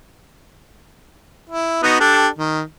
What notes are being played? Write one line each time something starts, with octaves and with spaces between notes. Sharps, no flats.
E4
B3 D#4 F#4
D4 G4 A4
D#3